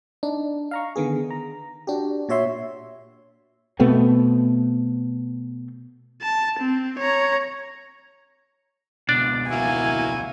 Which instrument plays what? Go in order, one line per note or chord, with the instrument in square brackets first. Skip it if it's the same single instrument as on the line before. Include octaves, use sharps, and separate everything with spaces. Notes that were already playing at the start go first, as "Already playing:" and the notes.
[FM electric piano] D4 D#4
F5 A#5 C#6
D3 D#3 B3 G#4
A#5
D4 F#4 G4
A#2 F#4 C#5 E5 C6
[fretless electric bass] B2 A3 B3 C4
[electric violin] A5
C4
C#5 A#5
[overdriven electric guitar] C#2 B2 [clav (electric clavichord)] D4 D5
[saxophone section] A#3 E4 F#4 [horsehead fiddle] G#5